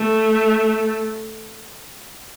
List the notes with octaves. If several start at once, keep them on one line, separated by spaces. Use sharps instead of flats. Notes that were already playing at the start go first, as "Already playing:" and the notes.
Already playing: A3